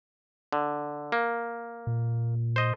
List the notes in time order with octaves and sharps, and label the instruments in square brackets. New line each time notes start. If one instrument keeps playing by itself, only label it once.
[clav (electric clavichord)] D3
A#3
[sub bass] A#2
[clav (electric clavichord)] C5 D#5